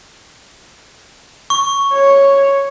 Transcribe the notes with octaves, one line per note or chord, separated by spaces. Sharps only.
C#6
C#5